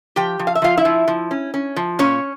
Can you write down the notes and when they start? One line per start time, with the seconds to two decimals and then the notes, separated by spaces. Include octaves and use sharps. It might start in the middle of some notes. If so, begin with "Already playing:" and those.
0.16 F3 G4 G5
0.39 F3
0.47 F5
0.55 E5
0.62 F3 F4 F5
0.77 E4 E5
0.85 F3
1.08 F3
1.31 C#4
1.54 C#4
1.76 F3
1.99 A#2 C#4 C#5